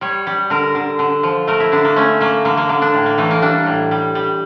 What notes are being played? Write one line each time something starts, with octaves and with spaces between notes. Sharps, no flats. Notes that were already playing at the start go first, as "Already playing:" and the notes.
G3 C#5
G3
D3 A#4
D3
D3
F3
A3 A#4
E4
D3 D4
A#3
A3 C#4
A3 A#3
D3 A#3
A#3
D3 A#3
D4
A2
A#3
E3 A3
A#3
G3 D4
A2
G3
G3